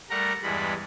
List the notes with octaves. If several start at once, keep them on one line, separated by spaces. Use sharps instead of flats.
G3 A3 A#4 F#5 A#5
E2 G2 G3 G#3 B5